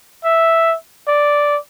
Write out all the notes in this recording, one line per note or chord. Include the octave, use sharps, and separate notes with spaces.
E5
D5